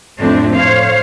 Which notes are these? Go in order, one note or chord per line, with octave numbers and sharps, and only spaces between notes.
F2 A2 F3 A3 C4 D4
A2 C5 C#5 F5